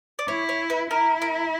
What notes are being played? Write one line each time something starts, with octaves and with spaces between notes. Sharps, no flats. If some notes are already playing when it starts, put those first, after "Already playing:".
D5
E4 C#5
C#5
B4
E4 A#4
A#4